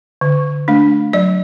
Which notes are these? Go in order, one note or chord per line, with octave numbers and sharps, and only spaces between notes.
D3
A3 D4
F#3 D5